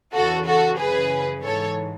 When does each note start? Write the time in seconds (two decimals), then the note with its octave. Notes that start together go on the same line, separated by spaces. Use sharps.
0.14 E2 C#3 E3 F#4 A4
0.46 F#4 A4
0.78 F#2 C#3 E3 G#4 B4
1.42 G#2 E3 A4 C#5